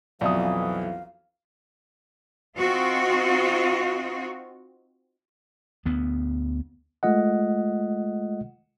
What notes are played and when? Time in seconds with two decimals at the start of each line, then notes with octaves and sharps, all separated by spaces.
0.21 B1 F2 E3 D5 E5 F5 D#6
2.56 C4 D#4 F4 F#4
5.86 D2 B3
7.03 G#3 A3 F4 D#5 F#5